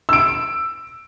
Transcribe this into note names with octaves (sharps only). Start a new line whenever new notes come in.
E6 D7